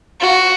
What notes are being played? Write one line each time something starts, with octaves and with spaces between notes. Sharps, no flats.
F#4